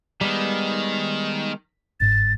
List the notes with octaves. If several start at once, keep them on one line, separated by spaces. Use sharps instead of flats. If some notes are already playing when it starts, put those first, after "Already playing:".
D#3 G3 G#3 B3 B6
G1 G#2 A6